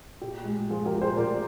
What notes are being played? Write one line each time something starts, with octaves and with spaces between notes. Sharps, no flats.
A#2 G4
G#3
F3 F4 G#4
G4 A#4
A#2
G#4 C5
A#2 A#4 D5